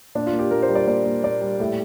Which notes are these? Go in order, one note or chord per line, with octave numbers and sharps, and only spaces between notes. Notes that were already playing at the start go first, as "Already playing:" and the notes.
A#2 D4
F4
A#3
G4
A#2 A#4
C5
G3
D5
A#2 D5
A#3
A#2 D5
G3
A2